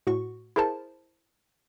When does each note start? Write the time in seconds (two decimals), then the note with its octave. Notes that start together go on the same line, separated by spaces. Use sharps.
0.07 A2 F#4 C#6
0.56 E4 G#4 A#4 C5 A5